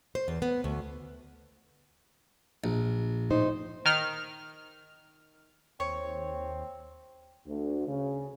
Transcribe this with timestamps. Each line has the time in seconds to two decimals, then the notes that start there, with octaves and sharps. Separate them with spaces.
0.15 C5
0.28 E2
0.42 B3
0.64 D2
2.64 A#1
3.30 A2 D#4 C5
3.85 D#3 F6
5.80 D#2 C4 C#5
7.47 D2
7.87 C#3